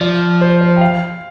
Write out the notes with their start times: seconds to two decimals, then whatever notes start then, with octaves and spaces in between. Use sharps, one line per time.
0.01 F3 D5
0.41 C5
0.61 C5
0.76 G5
0.81 F5